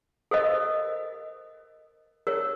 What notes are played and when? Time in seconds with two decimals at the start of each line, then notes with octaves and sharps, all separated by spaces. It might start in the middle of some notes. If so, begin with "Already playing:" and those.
0.31 A4 A#4 C5 D#5
2.27 A#4 C#5